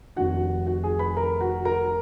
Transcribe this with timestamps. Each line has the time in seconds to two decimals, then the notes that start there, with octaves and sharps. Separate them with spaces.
0.16 F1 F2 D#3 F#4 F#5
0.66 F#4 F#5
0.83 G#4 G#5
0.99 B4 B5
1.17 A#4 A#5
1.41 F#4 F#5
1.65 A#4 A#5